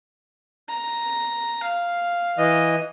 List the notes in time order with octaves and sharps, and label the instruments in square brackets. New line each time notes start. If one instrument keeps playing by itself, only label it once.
[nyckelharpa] A#5
F5
[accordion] E3 D#5